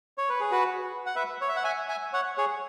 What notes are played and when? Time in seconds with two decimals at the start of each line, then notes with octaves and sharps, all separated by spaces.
0.18 C#5
0.29 B4
0.40 G#4
0.51 F#4 B4
1.06 F#5
1.16 B4 E5
1.41 C#5
1.49 E5
1.56 F#5
1.64 E5 G#5
1.88 E5 G#5
2.13 C#5 F#5
2.37 G#4 C#5